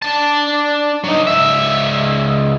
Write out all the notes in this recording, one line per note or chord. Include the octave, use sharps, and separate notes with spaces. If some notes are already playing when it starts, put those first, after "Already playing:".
D4 A5
F#3 D#4
C#2 E5